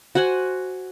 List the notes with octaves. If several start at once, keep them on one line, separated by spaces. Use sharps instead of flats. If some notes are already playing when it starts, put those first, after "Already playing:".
F#4 C5 F#5 G#5